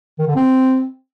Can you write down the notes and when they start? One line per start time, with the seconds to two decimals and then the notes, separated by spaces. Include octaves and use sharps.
0.19 D#3
0.27 D3
0.35 C4